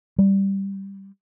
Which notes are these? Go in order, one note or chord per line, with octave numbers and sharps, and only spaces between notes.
G3